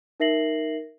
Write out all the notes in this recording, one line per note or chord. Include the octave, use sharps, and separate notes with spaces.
D#4 A#4 E5 A#6 C7 F#7